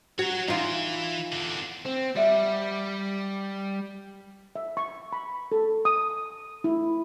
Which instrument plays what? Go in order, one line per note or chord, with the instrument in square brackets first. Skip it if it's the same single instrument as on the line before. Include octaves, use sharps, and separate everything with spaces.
[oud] F#4 [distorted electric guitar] C#5 A#5
[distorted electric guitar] E3 [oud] D#4 F4
[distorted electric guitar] E2 D3
[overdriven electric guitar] C4
[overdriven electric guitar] G3 [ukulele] D5 E5 F#5
[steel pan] E5
C#6
B5
A4
D#6
E4